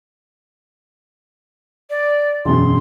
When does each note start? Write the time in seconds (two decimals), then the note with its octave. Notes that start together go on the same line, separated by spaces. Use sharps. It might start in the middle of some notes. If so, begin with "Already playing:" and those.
1.90 D5
2.45 E1 F#2 C6